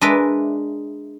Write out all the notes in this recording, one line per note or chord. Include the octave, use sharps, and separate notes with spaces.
G#3 D4 A#4 B4 E5